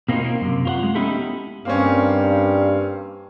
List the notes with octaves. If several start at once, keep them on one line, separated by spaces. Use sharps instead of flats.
B2 A#3 C4 C#4 D#4 F4
A#3
F#2 A2 C3
F4 C5 F#5
G#3
B3 C#4 D#4 E4 G4 A4
G2 A#3 C4 C#4